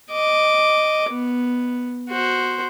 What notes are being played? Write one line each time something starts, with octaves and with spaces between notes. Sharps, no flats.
D#5 D6
B3
F#4 C5